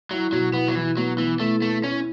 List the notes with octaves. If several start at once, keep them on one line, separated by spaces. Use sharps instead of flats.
F#3 E4
B2 F#3
B3 E4
F#3
E3 E4
F#3 B3
E3 B3
A3 E4
A3 B3
C#4 E4